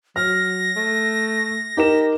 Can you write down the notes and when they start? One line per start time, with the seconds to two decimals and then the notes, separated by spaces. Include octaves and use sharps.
0.16 F#3 F6 A#6
0.76 A3
1.77 D#4 G4 A#4 E7